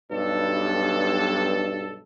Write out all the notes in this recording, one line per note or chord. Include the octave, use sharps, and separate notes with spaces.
B1 G2 A4